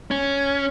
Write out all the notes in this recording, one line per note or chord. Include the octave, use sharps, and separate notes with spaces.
C#4